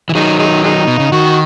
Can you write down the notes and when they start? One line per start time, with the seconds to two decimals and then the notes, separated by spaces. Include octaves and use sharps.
0.09 E3
0.15 D#3 F#3 G#3 D#4
0.39 G#3 D#4
0.63 G#3 D#4
0.87 B2
1.00 C#3
1.12 D#3 F#4